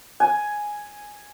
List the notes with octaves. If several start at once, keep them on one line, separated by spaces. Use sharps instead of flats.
G#5